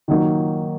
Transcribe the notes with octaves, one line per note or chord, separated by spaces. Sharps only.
D#3 F#3 A#3 D#4